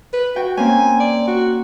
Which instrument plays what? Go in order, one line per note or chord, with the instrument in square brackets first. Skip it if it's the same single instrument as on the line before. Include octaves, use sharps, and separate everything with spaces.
[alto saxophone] B4
[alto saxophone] F#4 [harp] G5
[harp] A#3 C4 C#4 [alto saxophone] G#5
[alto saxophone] D5
F#4